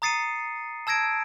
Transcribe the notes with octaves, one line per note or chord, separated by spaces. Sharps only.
A#5 D#6 A6 C7 C#7 D#7
A5 E6 G#6 A#6 D7